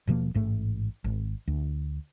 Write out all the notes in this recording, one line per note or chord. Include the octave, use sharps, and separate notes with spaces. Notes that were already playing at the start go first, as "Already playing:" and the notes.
D#1 B2 F3 A#3
A1 G#2 A3
G#1
D2